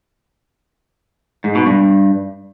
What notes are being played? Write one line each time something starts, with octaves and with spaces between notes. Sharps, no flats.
G#2
B2
G2